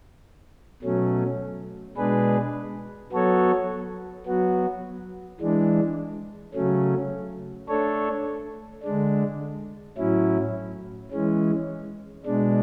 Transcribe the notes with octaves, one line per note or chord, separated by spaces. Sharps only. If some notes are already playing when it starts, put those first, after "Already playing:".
B2 F#3 A3 C#4
B2 G#3 D4 G#4 B4
F#3 B3 F#4 A4 C#5
F#3 B3 F#4
E3 G#3 D4
C#3 F#3 A3 C#4
A3 D4 A4 C#5
D3 G#3 D4
A2 F#3 C#4 E4
E3 G#3 C#4
B2 G#3 D4